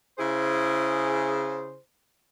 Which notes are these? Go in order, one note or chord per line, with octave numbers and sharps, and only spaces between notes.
C#3 E4 G#4 C5